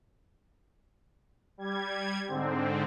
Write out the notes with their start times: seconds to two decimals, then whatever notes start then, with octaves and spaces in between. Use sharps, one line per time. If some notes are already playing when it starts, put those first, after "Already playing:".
1.58 G3 G#6
2.28 G#2 D3 C4